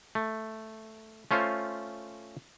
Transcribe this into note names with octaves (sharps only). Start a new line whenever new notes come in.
A3
A3 C#4 F4 C5